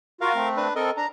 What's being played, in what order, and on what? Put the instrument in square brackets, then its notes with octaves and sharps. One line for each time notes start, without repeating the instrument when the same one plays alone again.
[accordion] F4 F#4 [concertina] A#4 F5
[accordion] A3 C4
[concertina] D4 B4
[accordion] C4 A4 [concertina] A#4 D#5
[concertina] D4 [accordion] A#5